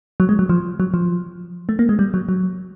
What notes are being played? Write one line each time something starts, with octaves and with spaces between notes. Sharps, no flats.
F#3
G#3
F#3
F3
F#3
F3
A3
A#3
G#3
G3
F#3
F#3